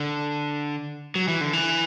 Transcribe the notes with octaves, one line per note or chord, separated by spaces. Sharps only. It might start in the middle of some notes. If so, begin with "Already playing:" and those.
Already playing: D3
F#3
E3
D3
E3